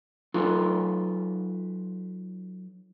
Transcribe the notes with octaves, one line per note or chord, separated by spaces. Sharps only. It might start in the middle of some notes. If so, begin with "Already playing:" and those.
F#3 D#4 F4 A4 B4